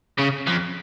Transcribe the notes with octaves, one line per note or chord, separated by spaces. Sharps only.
C#3
F2